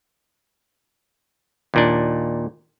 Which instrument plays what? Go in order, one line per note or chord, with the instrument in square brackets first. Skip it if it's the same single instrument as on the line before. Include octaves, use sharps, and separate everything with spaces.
[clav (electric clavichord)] D#2 A#2 D4